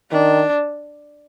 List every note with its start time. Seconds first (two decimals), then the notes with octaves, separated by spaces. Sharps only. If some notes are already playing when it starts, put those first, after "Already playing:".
0.12 D#3 D4